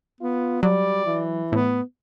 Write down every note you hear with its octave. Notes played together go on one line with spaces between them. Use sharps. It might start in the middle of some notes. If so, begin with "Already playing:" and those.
B3 F4
F#3 G3 D5
E3
A2 B3